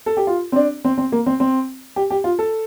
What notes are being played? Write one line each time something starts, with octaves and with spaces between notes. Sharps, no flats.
A4
G4
F4
C4
D4
C4
C4
A#3
C4
C4
G4
G4
F4
A4